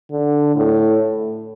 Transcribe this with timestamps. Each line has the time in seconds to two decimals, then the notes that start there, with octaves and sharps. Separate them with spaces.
0.11 D3
0.56 A2